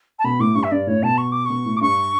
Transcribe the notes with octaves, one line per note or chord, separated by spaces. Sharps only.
A5
B2 B5
A2 D6
G2 C#6
E5
G2 D5
A2 C#5
B2 A5
C#6
D6
B2 C#6
A2
D6
G2 C#6